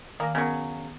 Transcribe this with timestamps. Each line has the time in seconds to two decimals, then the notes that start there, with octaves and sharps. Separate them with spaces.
0.20 D#3 A#3 G#5 A#6
0.35 C#3 F#3 B3 A#4